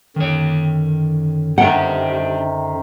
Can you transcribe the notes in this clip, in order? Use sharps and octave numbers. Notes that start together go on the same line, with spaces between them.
F#2 D3 D#3 C#5
C3 D#3 D4 G4 F#5